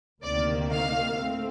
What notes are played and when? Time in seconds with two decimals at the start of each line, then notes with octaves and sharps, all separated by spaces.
0.23 D2 C3 D#3 A#3 D5
0.71 F5
1.18 A2 A3 C4